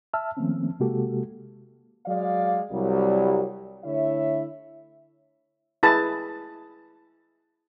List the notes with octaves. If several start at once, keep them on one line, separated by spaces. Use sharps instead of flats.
E5 A5 E6 F6
D#3 F3 A3 A#3 C4 C#4
C3 G#3 A#3 F#4 G4 A4
F#3 G#3 D5 F5
C2 F#3 G3
D3 A3 E4 C#5 E5
E4 G#4 B4 A5